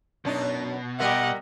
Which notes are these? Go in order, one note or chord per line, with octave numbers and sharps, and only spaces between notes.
F#2 B2 D4 D#4
G3 G4 A#4 D#5 E5 F#5